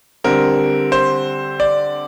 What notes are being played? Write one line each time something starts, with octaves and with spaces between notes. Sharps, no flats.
D3 G3 C4 A#4
C5
D5